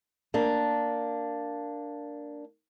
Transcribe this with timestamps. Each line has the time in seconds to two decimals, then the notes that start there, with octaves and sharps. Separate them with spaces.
0.34 A#3 D4